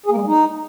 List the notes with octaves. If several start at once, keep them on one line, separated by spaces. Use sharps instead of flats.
G#4
A#3
G#3
G3
D#4